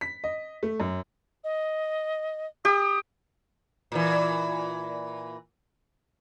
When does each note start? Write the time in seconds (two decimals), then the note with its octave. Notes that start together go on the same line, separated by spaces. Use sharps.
0.01 B6
0.24 D#5
0.63 A3
0.80 F#2
1.44 D#5
2.65 G4 D#6
3.92 A#2 E3